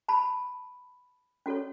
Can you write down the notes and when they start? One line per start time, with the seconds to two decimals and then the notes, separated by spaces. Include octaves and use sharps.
0.08 A5 B5
1.46 C#4 F#4 A4 C#5